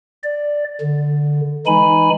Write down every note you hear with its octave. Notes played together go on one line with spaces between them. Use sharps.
D5
D3
E3 G#3 D#4 G#5 B5